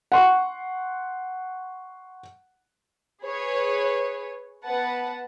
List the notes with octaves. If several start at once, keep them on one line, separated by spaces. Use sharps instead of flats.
F#5 C6 C#6
G#4 B4 C#5
B3 B4 F#5 A5